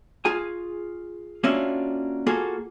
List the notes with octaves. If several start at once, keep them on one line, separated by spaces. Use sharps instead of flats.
F4 G#4 G#5
A#3 C#4 D4 F4 F#4 E5
A#3 F4 F#4 G#4 A4